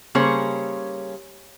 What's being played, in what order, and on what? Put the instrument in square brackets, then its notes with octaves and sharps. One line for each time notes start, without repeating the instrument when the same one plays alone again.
[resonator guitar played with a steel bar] C#3 G3 A#3 G#4 C5 C#5